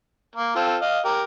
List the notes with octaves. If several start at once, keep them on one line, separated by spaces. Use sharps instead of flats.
A#3
C4 F4 A4
D#5 F5
G4 A#4